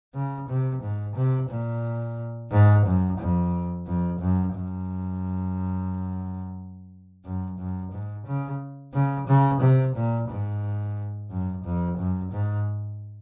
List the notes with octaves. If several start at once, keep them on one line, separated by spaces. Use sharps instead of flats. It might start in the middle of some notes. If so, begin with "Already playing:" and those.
C#3
C3
G#2
C3
A#2
G#2
F#2
F2
F2
F#2
F#2
F#2
F#2
G#2
C#3
C#3
C#3
C3
A#2
G#2
F#2
F2
F#2
G#2